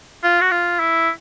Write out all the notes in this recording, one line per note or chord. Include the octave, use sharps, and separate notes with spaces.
F4
F#4
F4
E4